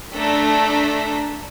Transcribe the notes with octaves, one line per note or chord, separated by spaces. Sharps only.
A3 D4 A4 A#5 B6